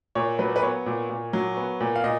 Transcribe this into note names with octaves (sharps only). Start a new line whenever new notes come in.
A#2 C#5
F#3 B4
B4
B3 C#5
A#2
A#2
F#3
B3
A#2
F5
A#2 D#5